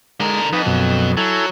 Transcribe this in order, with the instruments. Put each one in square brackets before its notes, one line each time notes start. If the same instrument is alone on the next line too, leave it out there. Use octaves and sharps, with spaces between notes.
[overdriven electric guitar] D3 A#4 [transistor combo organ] G#3
[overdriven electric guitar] F2 [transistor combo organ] D#4 B4
[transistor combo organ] F#2 B2
[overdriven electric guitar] F#3 [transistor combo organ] E4 A4 G#5